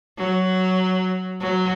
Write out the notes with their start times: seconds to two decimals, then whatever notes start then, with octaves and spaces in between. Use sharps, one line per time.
0.18 F#3
1.40 F#3